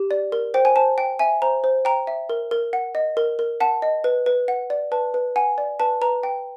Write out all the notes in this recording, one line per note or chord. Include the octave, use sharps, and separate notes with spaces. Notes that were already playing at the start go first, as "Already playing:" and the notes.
Already playing: G4
D5
A#4
C5 G5
G#5
C5 A5
G5
E5 G#5
C5 A#5
C5
G5 A#5
E5
A#4
A#4
F#5
D#5
A#4
A#4
F#5 A5
D#5
B4
B4
F#5
D5
B4 A5
B4
F#5 G#5
D5
B4 A5
B4 A#5
G5